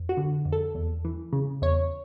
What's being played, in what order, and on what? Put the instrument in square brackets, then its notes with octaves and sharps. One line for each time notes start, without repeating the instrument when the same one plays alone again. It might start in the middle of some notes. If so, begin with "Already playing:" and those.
Already playing: [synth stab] F2
F#4
D3
F2
A4
E2
E3
C#3
E2 C#5